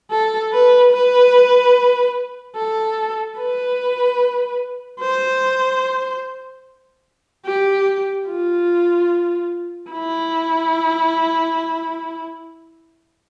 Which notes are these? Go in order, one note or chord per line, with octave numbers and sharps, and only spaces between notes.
A4
B4
B4
A4
B4
C5
G4
F4
E4